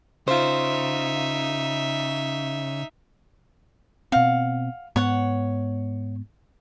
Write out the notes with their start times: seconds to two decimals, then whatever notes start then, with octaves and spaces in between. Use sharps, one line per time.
0.28 C#3 D#4 F4 C5 E5
4.12 B2 C4 F5 F#5
4.96 G#2 B3 C#5 F#5